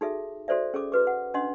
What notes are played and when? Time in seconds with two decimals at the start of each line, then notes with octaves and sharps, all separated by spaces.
0.01 D#4 F#4 G#4 A4 E5
0.48 F#4 A4 C5 D5 E5
0.74 C#4 G#4 A4 D6
0.92 F#4 B4 D6
1.07 F#5
1.34 C#4 D4 D#5 F#5 C6